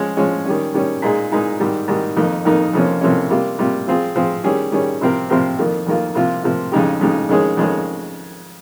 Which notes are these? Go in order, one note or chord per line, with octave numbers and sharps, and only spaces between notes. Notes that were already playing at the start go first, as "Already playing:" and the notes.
Already playing: F3 G#3 C#4
F3 G#3 C#4
D#3 G3 C#4
D#3 G3 C#4
A#2 G#3 D#4 G#4
A#2 G#3 D#4 G#4
G#2 D#3 G3
G#2 D#3 G3
F2 D#3 A#3 D#4
F2 D#3 A#3 D#4
F2 C3 F3 A#3 C#4
F2 C3 F3 A#3 C#4
C3 G3 A#3 F4
C3 G3 A#3 F4
F3 C4 F4 G#4
F3 C4 F4 G#4
D#3 G3 C#4 G#4
D#3 G3 C#4 G#4
C3 F3 C4 G4 A#4
C3 F3 C4 G4 A#4
F2 D#3 A#3 F4
F2 D#3 A#3 F4
C3 F3 A#3 F4
C3 F3 A#3 F4
F2 C#3 G#3 D#4 G4
F2 C#3 G#3 D#4 G4
F2 D#3 G#3 C#4 G#4
F2 D#3 G#3 C#4 G#4